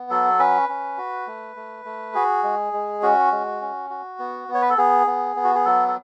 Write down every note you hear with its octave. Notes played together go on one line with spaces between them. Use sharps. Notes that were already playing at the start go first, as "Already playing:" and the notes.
Already playing: B3
F#3 A4
C#4 B4
C#4
F#4
A3
A3
A3
F#4 G#4
G#3
G#3
C#4 F#4
G#3
C#4
F#4
B3
B3
C#5
B4
A4
B3 G#4
B3
B3
F#4
G#4
F#3 A4
A4